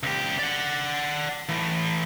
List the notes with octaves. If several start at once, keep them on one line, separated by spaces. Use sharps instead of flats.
C#2 G4
D5 F#5
A2 E3